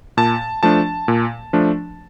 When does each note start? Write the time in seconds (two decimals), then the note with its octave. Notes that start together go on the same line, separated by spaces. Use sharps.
0.17 A#2 A5
0.63 F3 A3 D4 A5
1.08 A#2
1.53 F3 A3 D4